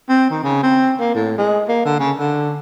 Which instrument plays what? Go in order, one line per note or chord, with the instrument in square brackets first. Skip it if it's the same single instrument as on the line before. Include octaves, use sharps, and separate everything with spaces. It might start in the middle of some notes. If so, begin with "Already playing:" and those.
[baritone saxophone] C4
D#3
C#3
C4
A#3
A2
G#3
A#3
D3
C#3
D3